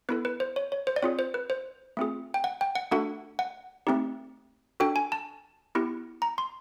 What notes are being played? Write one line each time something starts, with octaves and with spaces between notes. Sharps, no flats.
B3 E4 A4 B4
B4
C5
C#5
C#5
C5
D5
C4 F4 G#4 C#5
C5
B4
C5
A3 C4 F4 G#4
G5
F#5
G5
F#5
A3 D4 F#4 A4 F#5
F#5
A3 C4 D#4 G4
D4 F#4 A4 G5
G#5
A5
B3 E4 G4
A#5
C6